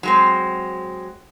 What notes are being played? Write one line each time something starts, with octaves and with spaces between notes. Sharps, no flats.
F#3 G#3 C4